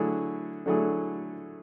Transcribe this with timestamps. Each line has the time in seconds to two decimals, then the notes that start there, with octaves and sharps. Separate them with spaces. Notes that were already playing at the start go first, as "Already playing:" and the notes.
Already playing: D3 F#3 A3 E4 G#4
0.66 D3 F#3 A3 E4 G#4